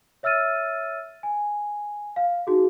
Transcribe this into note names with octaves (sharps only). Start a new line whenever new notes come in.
C#5 E5 E6 F6 A6 D#7
G#5
F5
D#4 F#4 G#4